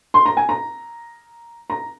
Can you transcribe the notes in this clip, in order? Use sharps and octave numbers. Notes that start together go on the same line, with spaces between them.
C6
A#5
G#5
A#5
A#5